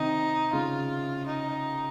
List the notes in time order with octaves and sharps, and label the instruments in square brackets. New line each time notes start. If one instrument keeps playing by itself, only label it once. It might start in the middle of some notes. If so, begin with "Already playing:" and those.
Already playing: [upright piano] C3 D#3 [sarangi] D#4
[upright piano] C#3 [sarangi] F4
[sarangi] D#4